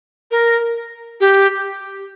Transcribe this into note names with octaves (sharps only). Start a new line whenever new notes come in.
A#4
G4